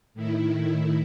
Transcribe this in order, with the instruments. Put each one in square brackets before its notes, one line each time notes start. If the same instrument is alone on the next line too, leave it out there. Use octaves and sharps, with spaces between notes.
[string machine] A2 D#3 E4